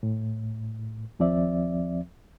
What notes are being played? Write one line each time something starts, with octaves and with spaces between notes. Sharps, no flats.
A2
D#2 F3 C4 D5 E5